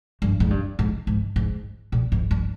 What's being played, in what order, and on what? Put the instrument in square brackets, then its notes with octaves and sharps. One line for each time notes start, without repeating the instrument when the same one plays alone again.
[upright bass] G2
G#2
G2
G#2
G#2
G#2
A#2
G#2
G2